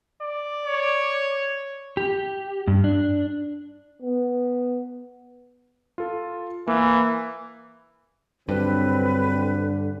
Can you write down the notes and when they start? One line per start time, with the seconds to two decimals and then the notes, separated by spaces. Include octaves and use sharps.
0.21 D5
0.66 C#5
1.97 G4
2.67 G2
2.84 D4
4.02 B3
5.98 F4 A4
6.68 E3 A#3
8.49 G2 D3 F#3 C4 B4